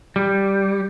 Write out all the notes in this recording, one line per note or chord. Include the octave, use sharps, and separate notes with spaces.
G3